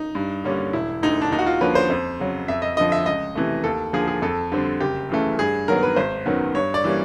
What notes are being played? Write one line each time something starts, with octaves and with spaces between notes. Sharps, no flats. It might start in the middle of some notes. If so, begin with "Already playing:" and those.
Already playing: D#4
G2
D3 G3 A#3 C#4
E1 E4
D2 D3 D#4
D4
D#2 D#4
F#4
F4
D3 F3 A#3 C#4 B4
C5
F2
C#3 F#3
F2 E5
D#5
D3 F3 D#5
E5
C#2 D#5
C3 E3 A3
D#2 A4
D3 F3 A#3 G#4
G#4
F2 A4
D3 G3 C4
F#1 G4
F#2 C#3 E3 A3
G2 G#4
D#3 F#3 B3 A#4
B4
G#1 C5
F#2 D#3 F#3 B3
G2 C#5
D5
E3 G3 A#3 C#4